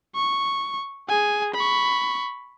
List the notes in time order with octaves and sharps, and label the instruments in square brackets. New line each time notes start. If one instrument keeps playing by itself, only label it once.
[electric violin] C#6
G#4 G#5
B5 C#6